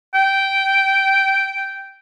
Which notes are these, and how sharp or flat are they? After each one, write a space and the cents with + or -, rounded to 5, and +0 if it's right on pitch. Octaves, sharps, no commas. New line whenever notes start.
G5 -10